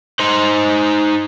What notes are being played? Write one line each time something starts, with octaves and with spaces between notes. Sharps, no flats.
D#4 C5